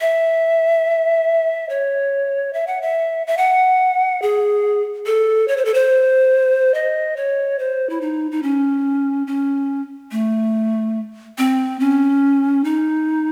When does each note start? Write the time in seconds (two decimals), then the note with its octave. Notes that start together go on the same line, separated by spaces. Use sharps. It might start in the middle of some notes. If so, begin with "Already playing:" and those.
0.01 E5
1.69 C#5
2.53 E5
2.67 F#5
2.82 E5
3.27 E5
3.37 F#5
4.22 G#4
5.06 A4
5.48 C#5
5.57 C5
5.65 A4
5.74 C5
6.74 D#5
7.17 C#5
7.59 C5
7.90 E4
8.01 D#4
8.32 D#4
8.43 C#4
9.27 C#4
10.11 A3
11.38 C4
11.80 C#4
12.64 D#4